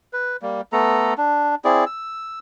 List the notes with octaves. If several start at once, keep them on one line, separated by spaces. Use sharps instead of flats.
B4
G3 A#3
A3 B3 A4 A#5
D4
C4 E4 G#4 D5
E6